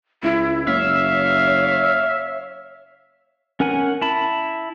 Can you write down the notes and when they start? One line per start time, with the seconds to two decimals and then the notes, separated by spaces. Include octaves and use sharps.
0.23 C#2 E4
0.67 F#1 C#5 E5 F5
3.60 C#4 A#4 F#5 G#5
4.02 E4 A5 B5